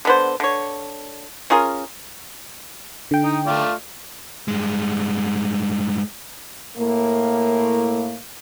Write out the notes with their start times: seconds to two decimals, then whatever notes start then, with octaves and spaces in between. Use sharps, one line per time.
0.05 D3 B3 C5
0.40 D3 C#5
1.50 C#4 F4 G#4 A#4
3.11 D3 G5
3.24 D#4
3.47 A3 F4 D5
4.48 G2 G#3
6.77 A2 A#3